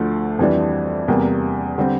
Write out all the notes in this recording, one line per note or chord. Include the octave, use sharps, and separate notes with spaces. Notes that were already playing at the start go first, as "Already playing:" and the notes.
Already playing: D2 D3 F3 A3
F2 E3 G3 D4
E2 C3 G3 A#3
D3 G3 C4